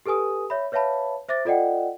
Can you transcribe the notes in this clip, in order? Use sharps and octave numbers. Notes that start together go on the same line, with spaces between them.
G4 A4 B4 G#5 D#6
C#5 E5 B5
B4 C#5 E5 F5 A5 B5
C5 E5 D6 A6
F4 A4 D5 D#5 F#5 G5